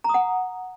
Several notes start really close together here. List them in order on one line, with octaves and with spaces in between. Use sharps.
A#5 D#6 F#5